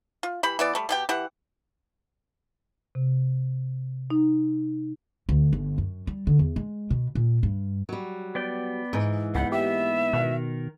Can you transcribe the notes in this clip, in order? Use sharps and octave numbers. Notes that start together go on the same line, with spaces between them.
F4
E3 G4 B5
E3 B3 D5
G3 A3
B2 G4 G5
E3 G4 F#5
C3
D#4
D2
G1
F#2
G3
D3
E2
G#3
B2
A#2
G2
F#3 G3
B3 D5 G5
G#2 E3
C#2 A#3 B3 F#5 G5
G4 E5
B2 D#3 A#4 F#6